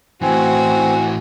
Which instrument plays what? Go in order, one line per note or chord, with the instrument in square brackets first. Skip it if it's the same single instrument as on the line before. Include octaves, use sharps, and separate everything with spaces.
[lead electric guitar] A2 E3 [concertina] C4 [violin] F#4 [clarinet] G#5